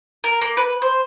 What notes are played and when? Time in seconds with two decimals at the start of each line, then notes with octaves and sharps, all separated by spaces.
0.24 A#4
0.41 A#3
0.57 B4
0.82 C5